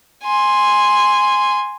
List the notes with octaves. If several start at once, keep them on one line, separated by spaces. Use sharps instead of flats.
G#5 C6